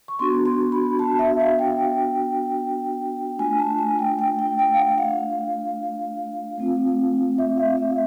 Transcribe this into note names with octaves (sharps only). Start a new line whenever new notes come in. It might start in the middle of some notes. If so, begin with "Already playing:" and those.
C#6
B3 D4 F#4 C6
C6
B5
A5
E5
F5
G5
A3 D4 F4 G#5
A5
G#5
G5
G5
G5
G5
F5
F#5
F5
A3 C4 F4
E5
F5
E5